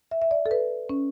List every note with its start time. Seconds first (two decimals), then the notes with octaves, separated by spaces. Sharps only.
0.11 E5
0.22 E5
0.31 D5
0.46 A4
0.51 B4
0.89 C#4